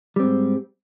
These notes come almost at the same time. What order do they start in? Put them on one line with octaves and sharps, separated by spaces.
G3 C4 G#2